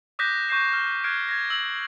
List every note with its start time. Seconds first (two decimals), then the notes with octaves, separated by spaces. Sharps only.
0.19 D6 D#6 F#6 G6 A#6 B6
0.49 C#6 G6 A#6 C7 E7
0.73 F6
1.04 F6 F#6 G#6 C7 D7
1.28 G#6 A#6
1.50 E6 F#7